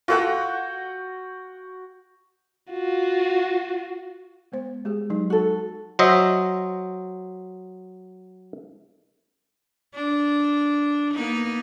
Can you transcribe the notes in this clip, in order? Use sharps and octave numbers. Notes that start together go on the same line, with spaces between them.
F4 F#4 A4 F#5 G5
F4 F#4
G#3 B3 C5
G#3 G4 G#4
F#3 D#4
F#4 A4
F#3 C5 D#5 E5
D4
A#3 B3 D#4